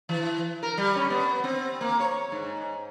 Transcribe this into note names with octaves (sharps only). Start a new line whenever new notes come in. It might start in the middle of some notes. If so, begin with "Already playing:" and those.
E3
A#4
G3
C#4
B3
C4
A#3
C#5
G#2